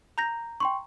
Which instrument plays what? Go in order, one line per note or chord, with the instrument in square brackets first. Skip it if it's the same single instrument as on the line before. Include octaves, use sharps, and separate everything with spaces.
[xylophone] A#5 G6 A#6
[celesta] G5 C6 C#6